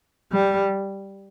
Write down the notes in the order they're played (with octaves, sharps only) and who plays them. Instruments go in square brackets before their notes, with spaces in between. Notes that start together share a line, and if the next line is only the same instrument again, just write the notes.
[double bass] G3